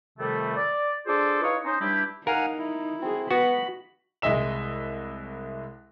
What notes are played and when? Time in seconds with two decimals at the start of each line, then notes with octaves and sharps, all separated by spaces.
0.18 F2 C3 D#3 G3 A3
0.57 D5
1.07 D4 F4 G#4 A4 C5 D6
1.42 D#4 E4 B4 C#5 D#5 F5
1.64 C#4 D#4 C5
1.80 G2 G3 D4 E4 G4
2.27 D#4 A#4 F5 F#5 G#5
2.59 E4
3.02 C4 F#4 G#4
3.31 B3 F#4 B5
4.22 C2 G#3 D#5 E5 E7